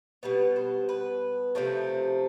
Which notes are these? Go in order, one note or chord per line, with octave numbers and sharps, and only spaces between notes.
B2 G3 B3 B4
C5
B4
C3 F3 A3 C4